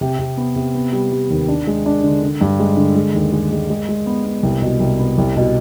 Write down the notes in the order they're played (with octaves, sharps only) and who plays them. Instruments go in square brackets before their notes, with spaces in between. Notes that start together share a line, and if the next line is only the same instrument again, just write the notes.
[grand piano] C3
C3
B3
C3
B3
G3
G3
D#2
D4
G#3
D4
D3
D3
G2
G#3
D3
G#3
D#2
G#3
G#3
G#3
G#3
B3
B3
C2
B2
C2
B3
C2
B2